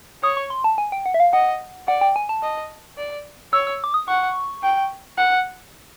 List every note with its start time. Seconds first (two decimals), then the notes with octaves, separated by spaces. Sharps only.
0.23 C#5 D#6
0.37 C#6
0.50 C6
0.64 A5
0.78 G#5
0.92 G5
1.06 F#5
1.14 E5
1.20 F5
1.33 D#5 F#5
1.88 D5 F#5
2.01 G5
2.16 G#5
2.29 A5
2.43 D#5
2.98 D5
3.53 C#5 E6
3.67 E6
3.84 D6
3.94 D#6
4.08 F#5 C#6
4.63 G5
5.18 F#5